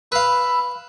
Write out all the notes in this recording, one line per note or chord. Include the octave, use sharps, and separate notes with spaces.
B4 F5 B5 E6